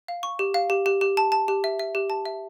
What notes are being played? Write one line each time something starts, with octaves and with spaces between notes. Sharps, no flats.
F5
C#6
G4
F5
G4
G4
G4
A5
A5
G4
E5
E5
G4
A5
E5